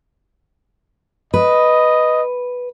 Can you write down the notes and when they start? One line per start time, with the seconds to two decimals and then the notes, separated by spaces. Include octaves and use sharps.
1.34 B4 D#5